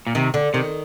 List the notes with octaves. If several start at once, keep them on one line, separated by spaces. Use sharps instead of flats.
A#2
C3 D#3
D3
C3 D#3